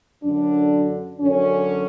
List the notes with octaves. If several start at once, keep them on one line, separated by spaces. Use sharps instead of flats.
F#2 D3 D4
F#2 D3 C#4